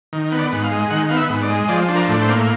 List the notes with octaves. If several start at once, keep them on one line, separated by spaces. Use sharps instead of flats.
D#3
B3
D5
G#2
F5
G#3
D#3 F#5
B3 F5
E5
G#2
D5
G#3
F3 D5
D4
A#4
A2
C5
A#3